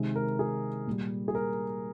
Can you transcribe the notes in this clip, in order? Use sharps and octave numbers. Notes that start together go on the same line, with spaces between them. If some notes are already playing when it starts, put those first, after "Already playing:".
Already playing: C3 D#3 G#3
A#4
G#4
A#2 G3
G#4
A#4